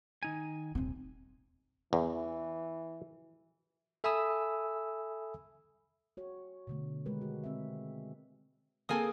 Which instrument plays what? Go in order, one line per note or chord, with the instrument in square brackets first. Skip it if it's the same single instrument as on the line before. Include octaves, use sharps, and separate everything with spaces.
[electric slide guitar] D#3 D#4 G#5
[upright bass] D#1 C4
[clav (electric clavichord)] E2 [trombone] E3
[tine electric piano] A4 E5 G#5 B5 D#6 E6
[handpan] F#4 C#5
B2 D3 A3
D#3 G#3 G4 A#4 B4
F#4
C4 E5
[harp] A#3 C4 G#4 [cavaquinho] A4 G#5 D#6